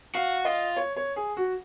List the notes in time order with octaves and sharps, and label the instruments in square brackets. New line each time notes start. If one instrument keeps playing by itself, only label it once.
[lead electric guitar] F#4 [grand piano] F5
[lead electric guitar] F4 [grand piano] D#5
[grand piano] C#5
C#5
G#4
F#4